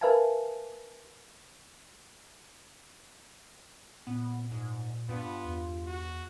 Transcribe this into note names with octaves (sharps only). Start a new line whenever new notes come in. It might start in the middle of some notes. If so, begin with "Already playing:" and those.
A#4 B4 E5 F5 G#5 A5
A#2 B3
G#2
G2 B3 F4
E2
F#4